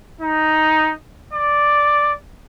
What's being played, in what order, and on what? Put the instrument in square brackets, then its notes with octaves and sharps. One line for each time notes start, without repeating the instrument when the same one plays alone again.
[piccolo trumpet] D#4
D5